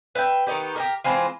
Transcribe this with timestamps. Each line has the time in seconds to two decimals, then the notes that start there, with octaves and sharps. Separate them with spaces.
0.15 B4 E5 F5 G5
0.47 D#3 B3 D#4 G4
0.76 G4 A4 A#4
1.04 E3 G#3 C4 F4